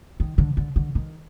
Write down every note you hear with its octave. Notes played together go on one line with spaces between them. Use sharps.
D#3
D3
D3
D3
D#3